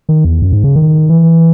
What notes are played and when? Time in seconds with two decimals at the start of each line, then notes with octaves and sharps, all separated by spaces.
0.09 D#3
0.25 E2
0.42 F#2
0.53 G#2
0.64 C#3
0.76 D#3
1.09 E3